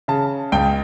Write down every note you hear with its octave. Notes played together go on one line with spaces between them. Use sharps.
C#3 A5
C#2 G5